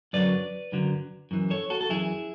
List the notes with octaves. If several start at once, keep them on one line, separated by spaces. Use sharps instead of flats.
F#2 D3 F#3 B4 D5
F#2 D3 F#3
F#2 E3
A4 C#5
F#4 A4
A4
F#2 E3 E4 G#4